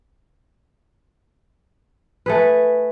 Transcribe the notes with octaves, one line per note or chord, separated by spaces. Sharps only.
A3 G#4 B4